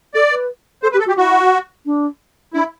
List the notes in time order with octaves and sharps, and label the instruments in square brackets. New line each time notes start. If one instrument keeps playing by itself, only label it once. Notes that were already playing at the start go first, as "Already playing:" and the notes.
[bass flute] A4 [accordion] D5
[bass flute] B4
[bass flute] A4 [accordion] C5
[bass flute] G4 [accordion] B4
[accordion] A4
[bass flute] F#4 [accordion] G4
[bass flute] E4 [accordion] F#4
[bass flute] D4
[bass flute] D4 [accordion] E4